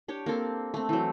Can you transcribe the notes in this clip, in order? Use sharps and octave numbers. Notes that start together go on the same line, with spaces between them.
D4 G4 C#5
A#3 C4 A4
A3 C4
E3 F#3